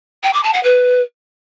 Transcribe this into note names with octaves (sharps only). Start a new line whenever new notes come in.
G5
D6
A5
F#5
B4